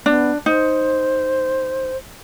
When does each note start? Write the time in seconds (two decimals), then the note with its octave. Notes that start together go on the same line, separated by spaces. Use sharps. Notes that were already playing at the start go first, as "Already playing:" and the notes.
0.06 B3 D4
0.46 D#4 C5